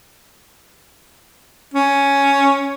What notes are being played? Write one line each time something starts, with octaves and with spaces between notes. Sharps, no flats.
C#4